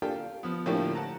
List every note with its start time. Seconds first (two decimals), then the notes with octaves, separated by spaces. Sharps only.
0.02 A#3 D4 F4 G4 A4
0.15 F5
0.43 F3 B3
0.66 A2 D3 F3 A3 A#3 G4
0.95 F#5 A5 A#5